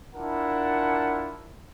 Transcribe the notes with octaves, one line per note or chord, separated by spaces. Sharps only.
D4 E4 F4 A#4 F#5 A5